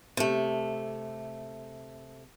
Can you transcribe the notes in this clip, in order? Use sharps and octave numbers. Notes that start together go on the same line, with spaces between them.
C3 A3